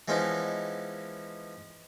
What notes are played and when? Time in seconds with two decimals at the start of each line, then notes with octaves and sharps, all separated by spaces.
0.08 E3 F3 G#3 B3 C#4 D#4